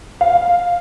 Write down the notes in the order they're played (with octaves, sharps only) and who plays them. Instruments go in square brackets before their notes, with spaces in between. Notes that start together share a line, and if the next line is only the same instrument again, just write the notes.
[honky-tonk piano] F5